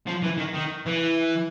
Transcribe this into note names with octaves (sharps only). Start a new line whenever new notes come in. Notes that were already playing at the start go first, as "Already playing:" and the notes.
F3
E3
D#3
D#3
E3